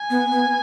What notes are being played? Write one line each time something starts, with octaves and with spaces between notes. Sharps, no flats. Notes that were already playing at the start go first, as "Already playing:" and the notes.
Already playing: G#5
B3
B3